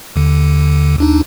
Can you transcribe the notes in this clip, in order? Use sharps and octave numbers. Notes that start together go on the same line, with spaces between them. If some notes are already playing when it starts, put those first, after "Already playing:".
D#2 D3
D#2 D4 D#4